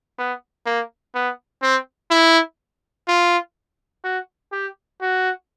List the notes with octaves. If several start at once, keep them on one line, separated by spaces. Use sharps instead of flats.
B3
A#3
B3
C4
E4
F4
F#4
G4
F#4